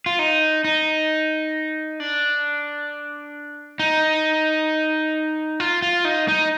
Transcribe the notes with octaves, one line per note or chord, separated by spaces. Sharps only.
F4
D#4
D#4
D4
D#4
F4
F4
D#4
D#4